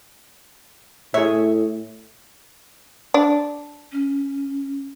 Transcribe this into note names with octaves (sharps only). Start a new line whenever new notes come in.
A2 G#4 C#5 E5
D4
C#4